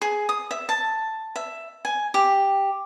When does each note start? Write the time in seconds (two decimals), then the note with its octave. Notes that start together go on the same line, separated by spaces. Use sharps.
0.02 G#4
0.29 D#6
0.51 E5
0.69 A5
1.36 E5
1.85 G#5
2.14 G4